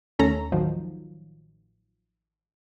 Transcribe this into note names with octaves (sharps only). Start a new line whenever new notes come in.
D#2 A3 C#4 A4 A#5
A1 D#3 F3 F#3